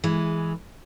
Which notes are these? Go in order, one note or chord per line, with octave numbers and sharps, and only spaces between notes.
E3 G#3